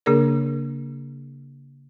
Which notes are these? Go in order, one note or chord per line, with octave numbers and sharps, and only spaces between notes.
C#3 A#3 D4 G#4 A#4